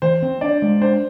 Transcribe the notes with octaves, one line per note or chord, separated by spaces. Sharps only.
E3 C5
C4
D4 D5
G#3
D4 C5